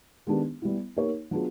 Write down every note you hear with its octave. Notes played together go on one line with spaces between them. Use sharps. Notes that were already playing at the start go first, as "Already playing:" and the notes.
D#3 G#3 B3 D4 G4
G3 B3 E4
A#3 D#4 G4 A#4 C#5
F#3 B3 D4 F4 G#4